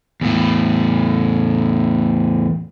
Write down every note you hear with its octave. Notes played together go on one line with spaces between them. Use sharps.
E2 A2